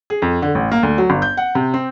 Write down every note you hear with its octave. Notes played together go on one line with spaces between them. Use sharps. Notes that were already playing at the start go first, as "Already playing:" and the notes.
G#4
F2
D3
A1
A#3
D2
F#3
G1
G6
F#5
C3
C4